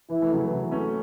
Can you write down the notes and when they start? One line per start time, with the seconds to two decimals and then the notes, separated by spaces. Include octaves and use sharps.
0.10 E3 E4
0.22 E3 A3
0.33 C#3 F#3
0.46 E3
0.54 C#3
0.63 E3
0.71 A3 C#4